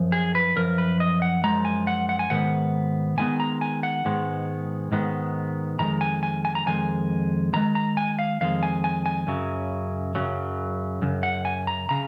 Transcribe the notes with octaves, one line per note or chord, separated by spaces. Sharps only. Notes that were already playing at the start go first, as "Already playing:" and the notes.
Already playing: F#2 F3
G#4
B4
F#2 F3 A#4
B4
D#5
F#5
F#2 F3 G#3 A#5
G#5
F#5
F#5
G#5
G#2 D#3 B3 F#5
G#2 D#3 G#3 B3 G#5
A#5
G#5
F#5
G#2 D#3 G#3 B3
G#2 D#3 G#3 B3
F2 D#3 G#3 A#5
G#5
G#5
G#5
A#5
F2 D#3 G#3 G#5
F2 D#3 G#3 A#5
A#5
G#5
F5
F2 D#3 G#3 F5
G#5
G#5
G#5
F#2 C#3 F#3
F#2 C#3 F#3
F#2 C#3
F#5
G#5
A#5
C#3 A#5